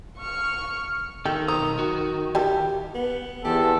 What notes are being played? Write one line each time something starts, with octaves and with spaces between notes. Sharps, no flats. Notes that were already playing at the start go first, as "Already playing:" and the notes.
C#6 F6
D#3 G4 A4
B1 C5 A#5 D#6
F#4
E3 G3 G4 A4
B3
E2 G4 A4